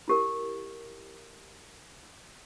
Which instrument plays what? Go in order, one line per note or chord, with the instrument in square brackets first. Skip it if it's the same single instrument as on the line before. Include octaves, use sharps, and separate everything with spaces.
[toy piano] E4 G4 A#4